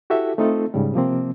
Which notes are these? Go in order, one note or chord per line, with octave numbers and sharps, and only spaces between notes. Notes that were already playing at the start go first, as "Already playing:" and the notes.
E4 F#4 G4 A4 E5
A3 C4 D#4 F4 A4
G#2 C#3 G3
C3 F3 A#3 C4